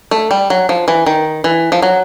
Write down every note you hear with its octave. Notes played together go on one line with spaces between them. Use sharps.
A3
G3
F#3
F3
E3
D#3
E3
F3
F#3